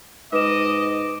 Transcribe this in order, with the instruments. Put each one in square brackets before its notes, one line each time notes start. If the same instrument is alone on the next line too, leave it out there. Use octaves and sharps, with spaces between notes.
[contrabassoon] G#2 [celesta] B4 E7 [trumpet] D#5 [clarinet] D6